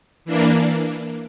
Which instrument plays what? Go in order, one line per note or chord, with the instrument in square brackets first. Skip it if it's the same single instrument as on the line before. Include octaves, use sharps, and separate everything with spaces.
[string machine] E3 A#3 D4